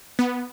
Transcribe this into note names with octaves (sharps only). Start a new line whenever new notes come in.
B3